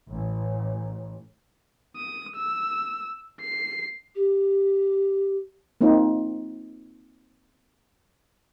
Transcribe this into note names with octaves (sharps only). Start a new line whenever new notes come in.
A1
D#6
E6
C7
G4
A#3 C4 D#4 F4